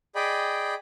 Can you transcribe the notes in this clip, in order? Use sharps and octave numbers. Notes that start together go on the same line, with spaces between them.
G#4 D5 D#5 G5 B5